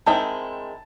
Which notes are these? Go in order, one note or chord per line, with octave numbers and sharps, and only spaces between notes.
D#3 G#3 C4 E4 A5